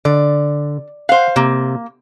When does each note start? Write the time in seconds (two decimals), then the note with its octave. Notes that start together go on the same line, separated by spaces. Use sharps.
0.05 D3 D5
1.09 C5 F5 F#5
1.36 C3 A#3